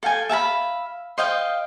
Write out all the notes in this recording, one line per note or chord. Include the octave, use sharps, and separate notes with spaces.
A4 F5 G5 G#5
E5 F5 A5 B5
C5 D#5 F5 G5